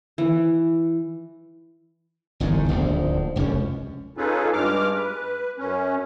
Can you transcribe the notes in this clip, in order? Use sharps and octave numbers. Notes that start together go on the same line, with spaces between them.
E3
G1 E2 G#2 D#3
D1 A#1 G#2
F1 C#2 F#2 C#4
C#4 D#4 F4 G#4 A4 B4
G2 G#3 D6 F6
B4
F#2 C#4